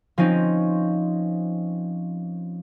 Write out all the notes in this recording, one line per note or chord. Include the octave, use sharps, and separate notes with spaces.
F3 C4 C#4 D#4